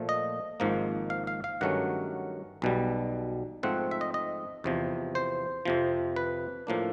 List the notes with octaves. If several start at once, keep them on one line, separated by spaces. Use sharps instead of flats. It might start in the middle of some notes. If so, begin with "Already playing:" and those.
Already playing: A#2 F3 A3
D#5
G#1 G#2 F3 A#3
F5
F5
F5
G2 D#3 F#3 A3 C#4 F#5
B1 B2 G3
G#2 F3 A3 C4 F#5
E5
D#5
D#5
E2 C3 F3
C5
F2 C3 F3
B4
A2 F3 A#3 D4